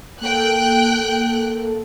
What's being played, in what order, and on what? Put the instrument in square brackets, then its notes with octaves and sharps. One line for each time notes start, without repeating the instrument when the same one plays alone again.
[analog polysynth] A#3 A4 [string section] G5 F#6